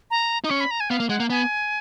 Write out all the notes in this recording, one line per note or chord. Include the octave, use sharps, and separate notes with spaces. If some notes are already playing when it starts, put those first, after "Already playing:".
A#5
D#4 D#6
C#4 C#6
B5
A#5
G#5
B3 F5
A#3
G#3 F#5
A#3
B3 G#5